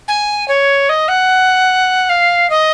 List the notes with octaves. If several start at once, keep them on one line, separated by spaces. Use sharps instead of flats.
G#5
C#5
D#5
F#5
F5
D#5